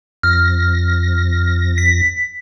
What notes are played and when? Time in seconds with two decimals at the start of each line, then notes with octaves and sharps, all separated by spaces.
0.23 F2 F6 A#6
1.78 B6